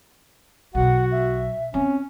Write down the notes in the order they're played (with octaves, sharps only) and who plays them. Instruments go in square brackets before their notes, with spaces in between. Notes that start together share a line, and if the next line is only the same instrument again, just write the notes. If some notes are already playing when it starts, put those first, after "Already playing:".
[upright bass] B1 [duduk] F#4 [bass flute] F#5
[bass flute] E5
[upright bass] C4 [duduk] C#4